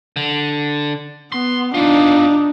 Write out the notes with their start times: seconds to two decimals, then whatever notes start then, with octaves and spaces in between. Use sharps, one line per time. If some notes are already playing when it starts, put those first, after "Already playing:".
0.16 D3
1.32 B3 C6
1.74 B3 D4 D#4 F4